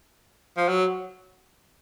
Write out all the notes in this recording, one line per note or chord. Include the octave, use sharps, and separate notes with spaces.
F3
F#3